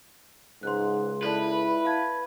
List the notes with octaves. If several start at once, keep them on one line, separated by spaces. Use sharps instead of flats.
C#2 G#2 C6 F#6
E4 A4 B4 D5 A5
F5 A5 G#6